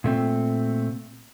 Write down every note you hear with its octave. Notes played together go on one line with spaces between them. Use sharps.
A#2 A3 C4